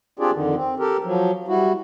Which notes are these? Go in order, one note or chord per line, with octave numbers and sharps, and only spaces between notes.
C4 D4 F4 G4 G#4 D5
F2 D3 D#3
C4
G4 A4 A#4
F3 F#3
G3 E4 F#4